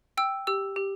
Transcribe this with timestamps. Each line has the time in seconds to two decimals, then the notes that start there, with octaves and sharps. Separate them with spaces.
0.17 G5 E6
0.47 G4 E6
0.76 G4